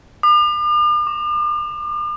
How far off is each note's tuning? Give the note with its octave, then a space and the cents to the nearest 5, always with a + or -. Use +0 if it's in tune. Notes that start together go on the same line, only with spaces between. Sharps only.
D6 +45
D6 -20